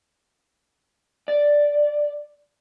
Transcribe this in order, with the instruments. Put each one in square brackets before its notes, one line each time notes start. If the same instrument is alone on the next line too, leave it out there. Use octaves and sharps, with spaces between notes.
[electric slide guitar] D5